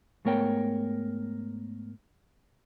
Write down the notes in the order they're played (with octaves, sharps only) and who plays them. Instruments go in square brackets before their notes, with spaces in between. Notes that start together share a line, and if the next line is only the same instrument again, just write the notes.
[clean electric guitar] G#2 A3 B3 A#4 C#5 G5